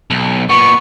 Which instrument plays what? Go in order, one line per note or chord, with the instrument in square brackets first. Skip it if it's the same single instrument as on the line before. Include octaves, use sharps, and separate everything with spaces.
[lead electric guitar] B1
[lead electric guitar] A#2 B3 [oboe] C#6